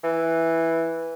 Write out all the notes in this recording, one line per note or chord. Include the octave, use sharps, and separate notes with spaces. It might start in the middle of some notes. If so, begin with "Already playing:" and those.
E3